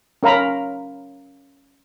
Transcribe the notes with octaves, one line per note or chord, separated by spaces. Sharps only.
C#4 A#4 F5 A#5 B5